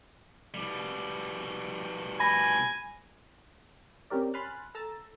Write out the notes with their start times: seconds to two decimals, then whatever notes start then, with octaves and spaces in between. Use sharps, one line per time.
0.54 B2 G3
2.20 G#5 B5 A#6
4.10 C4 C#4 G4 A#4 D5
4.34 G#5 B5 C6 F6 F#6 A6
4.75 A4 A#5 E6 A6